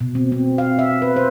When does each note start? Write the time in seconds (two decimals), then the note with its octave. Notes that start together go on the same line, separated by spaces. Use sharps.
0.01 B2
0.15 C4
0.32 C4
0.58 F5
0.79 E5
1.02 B4
1.16 C5